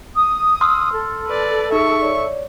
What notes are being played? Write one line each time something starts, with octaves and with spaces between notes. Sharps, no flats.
D#6
C6 E6 F6
A4
B4 D5
D#4 G#4 E5 C#6
C#5 D5